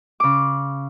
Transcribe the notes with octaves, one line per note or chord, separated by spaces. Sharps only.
C#3 D6